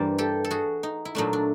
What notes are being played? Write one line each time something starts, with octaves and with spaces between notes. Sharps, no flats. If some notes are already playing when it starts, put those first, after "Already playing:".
Already playing: G2 E3 G3 A#3 C5 D5
G4 A4
A4
F#4 G#4
D#4
E4
A#2 F#3 A3 D4 D#4
D4